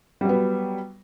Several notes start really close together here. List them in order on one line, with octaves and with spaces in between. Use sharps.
G3 F#3 B3